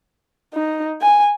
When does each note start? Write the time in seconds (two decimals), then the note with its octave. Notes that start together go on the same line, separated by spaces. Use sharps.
0.54 D#4
1.01 G#5